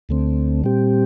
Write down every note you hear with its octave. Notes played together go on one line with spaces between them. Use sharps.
D2 D3 A3 C4
A#2 G3 C4 G4